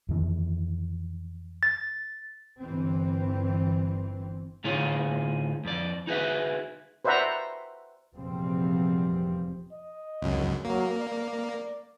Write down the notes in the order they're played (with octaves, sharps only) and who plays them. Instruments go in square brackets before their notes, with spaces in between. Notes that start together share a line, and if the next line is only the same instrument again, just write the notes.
[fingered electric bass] F2 D#3 E3
[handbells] A6
[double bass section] G1 E3 C4
[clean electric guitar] A2 D3 D#4 F4 G#4 C#5
F2 D5
D#4 F#4 G#4 B4 C#5 E5
[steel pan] B4 C5 D5 E5 F#5 A#5
[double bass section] F1 E2 A#2 F3 G3 C4
[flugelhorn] D#5
[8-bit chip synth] C#2 F#2
[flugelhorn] F#3 [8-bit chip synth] A#3
[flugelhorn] D5